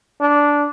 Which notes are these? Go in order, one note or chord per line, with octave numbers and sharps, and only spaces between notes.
D4